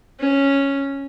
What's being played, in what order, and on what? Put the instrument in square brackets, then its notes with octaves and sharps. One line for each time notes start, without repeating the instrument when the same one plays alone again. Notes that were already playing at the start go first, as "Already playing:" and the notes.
[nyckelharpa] C#4